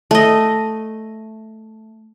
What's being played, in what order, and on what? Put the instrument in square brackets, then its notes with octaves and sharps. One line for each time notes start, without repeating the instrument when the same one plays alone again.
[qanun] A3 D#5